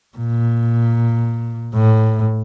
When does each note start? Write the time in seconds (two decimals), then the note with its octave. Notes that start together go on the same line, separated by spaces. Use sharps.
0.17 A#2
1.75 A2